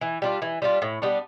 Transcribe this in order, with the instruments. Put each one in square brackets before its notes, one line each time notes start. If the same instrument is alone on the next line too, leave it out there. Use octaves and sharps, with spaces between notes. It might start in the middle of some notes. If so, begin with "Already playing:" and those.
[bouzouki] E3
G3 D4 F4
E3
G3 D4 F4
A2
G3 B3 D4